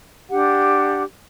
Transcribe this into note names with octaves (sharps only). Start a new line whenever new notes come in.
D4 G4 F#5